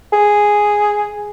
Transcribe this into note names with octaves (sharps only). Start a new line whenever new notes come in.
G#4